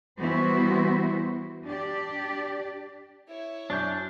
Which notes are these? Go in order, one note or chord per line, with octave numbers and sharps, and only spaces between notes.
E3 G3 B3 E4 F#4 C5
D4 G4 D5
E4 C#5
F#2 D4 D5 G6